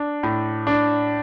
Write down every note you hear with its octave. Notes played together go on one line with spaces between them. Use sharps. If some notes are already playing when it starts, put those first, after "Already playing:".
Already playing: D4
A2
D4